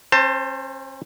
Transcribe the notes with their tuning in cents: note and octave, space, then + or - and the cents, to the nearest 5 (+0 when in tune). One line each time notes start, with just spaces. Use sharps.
C#4 -45 C5 +0 A5 +30